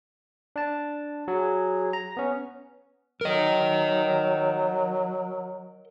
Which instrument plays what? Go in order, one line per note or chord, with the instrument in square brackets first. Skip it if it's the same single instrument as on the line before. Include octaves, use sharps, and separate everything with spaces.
[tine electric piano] D4 A5
[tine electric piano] F#3 [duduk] G#4
[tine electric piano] A#5
B3 C#4
[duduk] F#3 [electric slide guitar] A#4 D#5